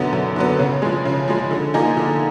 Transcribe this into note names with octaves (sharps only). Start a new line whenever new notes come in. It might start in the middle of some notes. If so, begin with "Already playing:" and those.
Already playing: F#2 D3 F#3 B3
F#2
D3 F#3 B3
C#3
F3 G#3
C#3
F3 G#3
D3
F3 A#3 D#4 G#4
D3